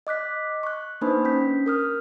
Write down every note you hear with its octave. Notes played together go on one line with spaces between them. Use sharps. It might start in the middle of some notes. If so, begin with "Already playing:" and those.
D#5 D6 F#6 B6
C#6 F#6
A#3 D4 D#4 B4 C5 B5
C#4 G6 B6
A#4 D#6 F6